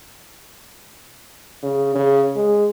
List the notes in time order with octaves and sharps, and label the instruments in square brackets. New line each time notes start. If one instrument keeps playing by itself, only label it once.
[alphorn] C#3
C#3
G#3